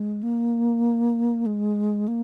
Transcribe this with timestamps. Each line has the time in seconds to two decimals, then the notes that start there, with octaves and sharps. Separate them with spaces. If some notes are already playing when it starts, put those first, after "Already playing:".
Already playing: G#3
0.23 A#3
1.46 G#3
2.08 A#3